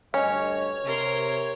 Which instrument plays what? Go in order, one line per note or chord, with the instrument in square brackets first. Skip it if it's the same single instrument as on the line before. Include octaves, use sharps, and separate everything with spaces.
[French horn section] D2 G2 D#5 [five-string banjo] C#4 [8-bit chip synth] C#5
[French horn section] C3 [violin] A#4 C6